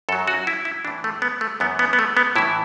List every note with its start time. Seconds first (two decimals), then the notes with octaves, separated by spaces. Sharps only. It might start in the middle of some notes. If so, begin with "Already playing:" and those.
0.09 F#2 A4
0.13 F#3
0.27 F#4
0.47 E4
0.65 E4
0.85 E3 D4
0.87 A2
1.04 A3
1.22 B3
1.41 A3
1.60 F#2 E3 B3
1.79 B3
1.93 B3
1.99 A3
2.17 B3
2.36 A2 E3 E4